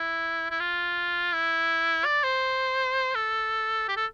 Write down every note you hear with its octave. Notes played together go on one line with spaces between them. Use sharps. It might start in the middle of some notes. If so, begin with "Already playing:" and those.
Already playing: E4
E4
F4
E4
D5
C5
A4
G4
A4